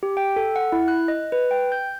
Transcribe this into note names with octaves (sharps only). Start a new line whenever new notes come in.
G4
G5
A4
F#5
E4
F#6
D#5
B4
G5
G6